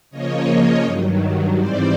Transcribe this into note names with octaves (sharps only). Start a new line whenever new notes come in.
C#3 F3 A#3 C#5 D#5
G2 D#3 F#3
G#2 E3 G3 C4 C5 D5